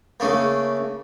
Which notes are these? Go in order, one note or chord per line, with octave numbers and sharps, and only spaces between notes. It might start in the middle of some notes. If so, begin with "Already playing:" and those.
C#3 A3 A#3